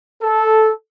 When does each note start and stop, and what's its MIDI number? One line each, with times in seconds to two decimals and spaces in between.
0.22 0.71 69